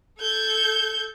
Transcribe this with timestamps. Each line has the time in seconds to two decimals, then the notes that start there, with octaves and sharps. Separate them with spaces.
0.18 A4 G6 G#6